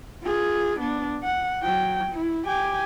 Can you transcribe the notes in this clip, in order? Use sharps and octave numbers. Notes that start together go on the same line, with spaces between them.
F4 G#4
B3 D4
F#5
F#3 G5
E4
G4 G#5